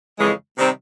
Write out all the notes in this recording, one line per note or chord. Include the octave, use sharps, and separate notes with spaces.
F2 C#3 E3 G#3
C3 D#3 G3 C4 D#4